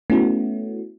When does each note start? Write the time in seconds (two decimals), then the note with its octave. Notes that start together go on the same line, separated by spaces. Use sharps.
0.10 A3 B3 C#4 E4 F#4